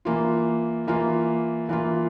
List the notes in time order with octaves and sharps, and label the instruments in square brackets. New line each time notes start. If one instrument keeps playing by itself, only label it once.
[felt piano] E3 A#3 F4
E3 A#3 F4
E3 A#3 F4